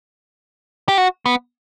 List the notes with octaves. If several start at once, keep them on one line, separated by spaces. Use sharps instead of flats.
G4
F#4
B3